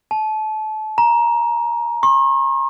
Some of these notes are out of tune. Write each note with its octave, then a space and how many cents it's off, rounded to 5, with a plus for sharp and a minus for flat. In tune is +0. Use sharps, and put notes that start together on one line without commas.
A5 -30
A#5 +15
C#6 -45